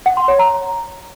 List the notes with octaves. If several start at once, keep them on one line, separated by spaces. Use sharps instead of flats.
F#5
C6
C#5
A#5